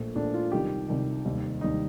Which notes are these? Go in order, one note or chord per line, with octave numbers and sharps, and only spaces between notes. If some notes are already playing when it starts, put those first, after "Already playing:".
Already playing: A#1 A#2 A3
A#1 A#2 A3 D4
F4
C2 C3 D#3 G3 G4
C2 C3 D#3 G3
F1 D#2 D#3 G3
F1 D#2 D#3 G3 D#4